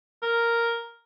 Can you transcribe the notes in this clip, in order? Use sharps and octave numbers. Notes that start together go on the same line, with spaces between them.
A#4